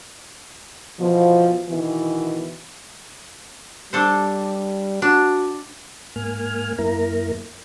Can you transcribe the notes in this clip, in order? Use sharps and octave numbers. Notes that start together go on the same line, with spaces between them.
B2 E3 F3
B2 D#3 E3
G3 D4 A4 C5
D4 F#4
G#2 A#3 G#5 F6
F#2 A#3 E4 A#4 A#5